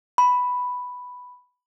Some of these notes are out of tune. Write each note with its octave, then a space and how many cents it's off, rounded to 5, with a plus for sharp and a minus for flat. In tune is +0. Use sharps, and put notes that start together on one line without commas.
B5 +5